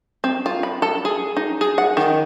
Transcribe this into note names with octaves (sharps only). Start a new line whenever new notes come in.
C4
F4
B5
A4
G#4
D#4
G#4
F#5
D#3